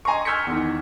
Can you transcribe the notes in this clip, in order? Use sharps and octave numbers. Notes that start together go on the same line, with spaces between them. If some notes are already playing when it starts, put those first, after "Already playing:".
D#5 G#5 A#5 C6 C#6
E6 F6 G6 G#6 B6 C#7
E2 D#3